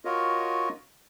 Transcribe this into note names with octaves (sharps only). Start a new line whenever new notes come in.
F4 F#4 A#4 C#5 D#5